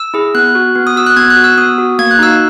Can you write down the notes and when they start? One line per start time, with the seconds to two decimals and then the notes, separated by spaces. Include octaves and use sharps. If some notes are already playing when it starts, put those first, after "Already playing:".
Already playing: E6
0.14 E4 G#4
0.35 B3 F#6
0.55 F#4
0.75 B3
0.87 D#6
0.96 F#4 E6
1.06 F#6
1.17 B3 G#6
1.30 F#6
1.36 F#4
1.44 E6
1.58 B3 D#6
1.78 F#4
1.99 A#3 G#6
2.11 F#6
2.19 D#4 F#4 E6